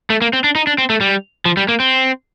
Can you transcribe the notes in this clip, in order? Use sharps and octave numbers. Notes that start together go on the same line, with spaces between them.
A3
A#3
C4
D4
D#4
D4
C4
A3
G3
F3
G3
A#3
C4